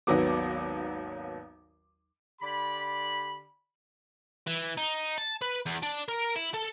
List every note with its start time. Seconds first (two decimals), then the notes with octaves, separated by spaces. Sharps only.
0.07 G#1 D#2 F#3 B3 D6
2.41 D3 G4 D5 B5
4.47 E3
4.77 D#4
5.18 A5
5.42 B4
5.66 E2
5.82 D4
6.08 A#4
6.36 E4
6.54 A4